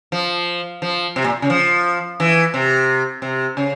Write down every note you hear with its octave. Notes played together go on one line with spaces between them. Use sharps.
F3
F3
C3
A#2
C#3
F3
E3
C3
C3
C#3